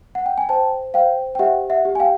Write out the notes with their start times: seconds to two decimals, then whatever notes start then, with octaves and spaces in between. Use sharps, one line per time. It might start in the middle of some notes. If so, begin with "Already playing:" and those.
0.15 F#5
0.26 G5
0.38 G#5
0.49 C5 G5 A5
0.94 C5 F5 G5
1.35 G5
1.39 G4 E5 F#5
1.70 E5 F#5
1.85 G4
1.95 G#5
2.00 F5 G5